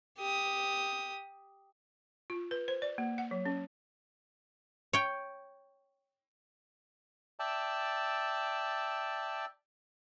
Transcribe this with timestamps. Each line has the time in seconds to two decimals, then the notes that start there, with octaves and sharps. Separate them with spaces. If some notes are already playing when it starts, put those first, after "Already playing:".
0.18 G4 D#6
2.30 F4
2.51 B4
2.68 C5
2.82 D5
2.98 A#3
3.18 F#5
3.31 F#3
3.45 C#4
4.93 C#5 G5
7.40 D5 E5 G5 A5